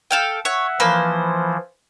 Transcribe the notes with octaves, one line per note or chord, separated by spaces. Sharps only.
A4 F5 G5
C#5 E5 F#5
E3 F3 A#3 B4 C5